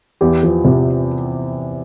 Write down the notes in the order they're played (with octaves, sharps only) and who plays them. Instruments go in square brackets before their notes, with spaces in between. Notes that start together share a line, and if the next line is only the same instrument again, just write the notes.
[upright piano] E2 G4
F3
C3